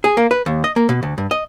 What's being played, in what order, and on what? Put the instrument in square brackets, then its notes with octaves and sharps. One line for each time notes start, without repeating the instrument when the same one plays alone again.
[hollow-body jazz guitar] G#4
A#3
B4
D#2
D#5
A#3
B2
D2
G2
D#5